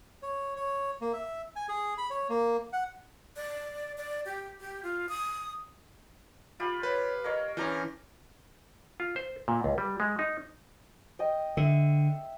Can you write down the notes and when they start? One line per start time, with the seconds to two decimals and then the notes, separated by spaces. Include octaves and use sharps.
0.23 C#5
0.56 C#5
1.01 A#3
1.13 E5
1.56 G#5
1.69 G#4
1.98 B5
2.10 C#5
2.29 A#3
2.73 F#5
3.36 D5
3.98 D5
4.25 G4
4.60 G4
4.83 F4
5.09 D#6
6.60 F4 G4 B5
6.83 B4 C#5
7.24 A#3 C#5 D#5
7.57 E3 C#4 D4 E4 G4 A#5
9.00 F4
9.16 C5
9.48 A#2
9.64 C#2
9.78 G3
10.00 G#3
10.19 D#4
11.19 D#5 G5
11.57 D3 E5